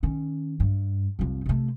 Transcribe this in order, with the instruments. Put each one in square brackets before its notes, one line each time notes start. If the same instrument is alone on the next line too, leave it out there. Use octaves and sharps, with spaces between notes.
[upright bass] D#3 C#4
G2
C2 F2
C3 A3